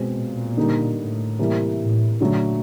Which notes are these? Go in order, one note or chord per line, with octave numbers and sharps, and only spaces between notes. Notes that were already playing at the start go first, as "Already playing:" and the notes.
Already playing: B2 G#3 C4
A#2
D3 G3 A#3 D#4
A2
C3 E3 G3 A#3
A2
A#2 D3 F#3 A3